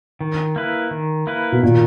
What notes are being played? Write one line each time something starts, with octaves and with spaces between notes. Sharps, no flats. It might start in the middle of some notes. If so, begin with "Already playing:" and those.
D#3
A#3 E4 B4
D#3
A#3 E4 B4
B2
A#2 D#3